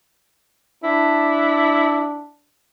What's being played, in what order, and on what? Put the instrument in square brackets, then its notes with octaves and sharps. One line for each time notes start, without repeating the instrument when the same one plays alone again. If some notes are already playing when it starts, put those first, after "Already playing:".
[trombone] D4 [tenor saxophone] E4